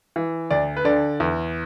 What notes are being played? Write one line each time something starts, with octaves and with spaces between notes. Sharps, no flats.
E3
D2 D5
B4
D3 D5
E2